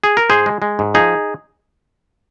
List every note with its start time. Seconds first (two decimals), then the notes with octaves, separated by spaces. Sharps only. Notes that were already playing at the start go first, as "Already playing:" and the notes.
0.04 G#4
0.17 A#4
0.30 G#2 G#4 C5
0.46 G#3
0.62 G#3
0.79 G#2
0.94 F3 D#4 G#4